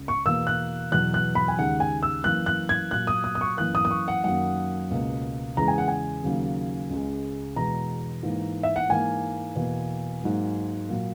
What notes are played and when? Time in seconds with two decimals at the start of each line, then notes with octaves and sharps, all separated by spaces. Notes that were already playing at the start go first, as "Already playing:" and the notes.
Already playing: C#2
0.08 C#6
0.26 E2 B2 A#3 E6
0.47 F#6
0.92 E2 B2 F#3 F#6
1.14 F#6
1.35 B5
1.48 G#5
1.58 D#2 C#3 G#3 F#5
1.80 G#5
2.03 E6
2.24 F#2 E3 A#3 F#6
2.46 F#6
2.69 G#6
2.91 A#2 F#3 A#3 F#6
3.07 D#6
3.24 D#6
3.35 D#6
3.41 C#6
3.57 F#2 E3 A#3 F#6
3.75 D#6
3.85 D#6
3.91 C#6
4.08 F#5
4.24 F#2 D#3 F#3 A#3 F#5
4.91 C#2 B2 A#3
5.57 E2 C#3 E3 G#3 A#5
5.68 G#5
5.78 F#5
5.88 G#5
6.23 D#2 C#3 F#3 A#3
6.90 C#2 C#3 G#3
7.56 E2 B2 G#3 A#5
8.23 G#2 E3 A#3
8.63 E5
8.76 F#5
8.89 G#2 E3 A#3 G#5
9.55 E2 B2 A#3
10.22 G#2 F#3 A#3
10.89 A#2 F#3 A#3